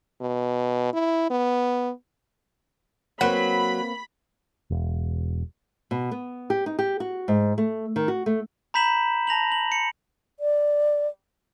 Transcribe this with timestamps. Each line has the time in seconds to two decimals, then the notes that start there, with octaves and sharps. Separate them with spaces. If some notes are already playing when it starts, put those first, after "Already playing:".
0.21 B2
0.93 E4
1.30 B3
3.21 F#3 A#3 C4 B4 F#5 B5
4.70 E1
5.91 B2
6.11 B3
6.50 G4
6.66 D#4
6.79 G4
7.00 F#4
7.28 G#2
7.58 A3
7.96 D#3
8.08 F#4
8.26 A3
8.74 A#5 B5 G6 B6 E7 F#7
9.27 A5 A#6 F7 F#7
9.52 F#7
9.72 C#7
10.40 D5